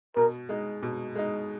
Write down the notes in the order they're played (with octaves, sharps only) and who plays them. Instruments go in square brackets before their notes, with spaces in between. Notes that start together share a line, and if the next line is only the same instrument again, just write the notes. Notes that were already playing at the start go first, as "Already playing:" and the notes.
[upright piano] B2 [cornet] A#4
[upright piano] G#3 D#4
B2
G#3 D#4